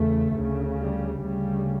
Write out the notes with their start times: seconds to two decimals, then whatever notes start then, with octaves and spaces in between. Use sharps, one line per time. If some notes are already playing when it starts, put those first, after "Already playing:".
Already playing: E2 C#3 A3
0.32 D2 C#3
0.76 G3
1.21 D2 C#3 G3